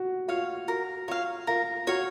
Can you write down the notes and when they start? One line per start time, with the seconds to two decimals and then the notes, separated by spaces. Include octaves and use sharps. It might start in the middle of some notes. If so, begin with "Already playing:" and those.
Already playing: F#4
0.28 F4 C#5 F5
0.68 F#4 A#4
1.08 F4 C#5 F5
1.47 F4 A#4
1.87 F#4 C#5 F5